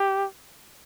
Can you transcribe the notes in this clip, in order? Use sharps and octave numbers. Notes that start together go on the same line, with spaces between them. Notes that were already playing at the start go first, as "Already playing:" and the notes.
Already playing: G4